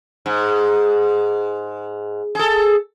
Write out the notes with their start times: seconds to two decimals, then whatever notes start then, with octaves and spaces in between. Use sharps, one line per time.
0.26 G#2
2.35 G#4 A4